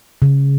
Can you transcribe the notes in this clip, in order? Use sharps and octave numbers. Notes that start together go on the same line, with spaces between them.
C#3